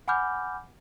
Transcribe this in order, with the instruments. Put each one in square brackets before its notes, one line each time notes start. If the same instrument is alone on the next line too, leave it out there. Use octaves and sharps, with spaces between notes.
[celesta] F#5 G#5 B5 D6 F6 G6